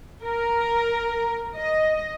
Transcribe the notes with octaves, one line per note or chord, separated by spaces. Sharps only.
A#4
D#5